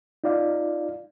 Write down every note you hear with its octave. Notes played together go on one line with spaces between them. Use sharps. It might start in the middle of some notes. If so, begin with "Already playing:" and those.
D#4 F4 D5 F5